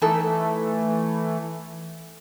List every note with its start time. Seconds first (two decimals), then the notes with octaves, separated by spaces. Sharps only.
0.02 E3 A3 D#4 E4 A4